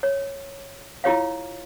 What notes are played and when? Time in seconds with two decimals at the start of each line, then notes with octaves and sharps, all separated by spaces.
0.03 C#5
1.04 E4 F4 G4 C#5 F5